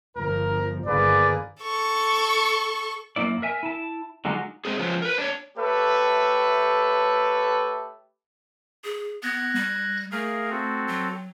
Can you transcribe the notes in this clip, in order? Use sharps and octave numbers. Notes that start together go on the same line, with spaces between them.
G1 F3 A#4
G1 D#3 A#3 G#4 B4 D5
A4 C#6
F#2 A#3 E4 D5
A#4 E5 G#5
E4 A5
D3 F#3 G#3 D#4 F4 F#4
G#3 C4 G#4
F3 F#3 G#3 B3 C#4 F4
A#4 B4
D4 C#5
A3 G4 A4 B4 C#5 E5
G#4
B3 F#6 G#6 A#6
G3
A3 G#4 A#4 F5
C4 F#4 A4
F#3